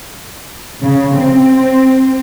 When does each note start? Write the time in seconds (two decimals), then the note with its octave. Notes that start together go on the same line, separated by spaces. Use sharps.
0.82 C#3
1.17 C4